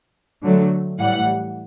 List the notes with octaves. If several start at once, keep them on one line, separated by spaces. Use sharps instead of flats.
D3 F#3 A3
A2 E3 G3 F#5